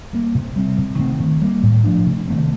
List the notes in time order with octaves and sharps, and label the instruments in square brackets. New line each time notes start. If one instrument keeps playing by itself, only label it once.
[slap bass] G3 A#3
C3
G3 C4
C3
D#3 A3 C4
D#3
G3 A#3
A2
F3 A3 D4
C3
D#3 A3 C4